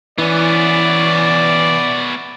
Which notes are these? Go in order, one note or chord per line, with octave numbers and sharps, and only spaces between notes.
E3 B3 C#4 D5